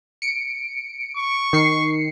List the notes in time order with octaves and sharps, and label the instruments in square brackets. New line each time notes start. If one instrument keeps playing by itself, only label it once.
[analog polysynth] C#7 D7
[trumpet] C#6
[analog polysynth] D#3 C7 C#7